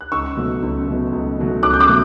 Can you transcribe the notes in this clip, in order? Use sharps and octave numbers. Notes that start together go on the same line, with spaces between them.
F#6
C#2 C#6 E6
B2 F#3 A3
C#2
B2 F#3 A3
C#2
B2 F#3 A3
C#2 D6 F#6
G6
D6 F#6
B2 F#3 A3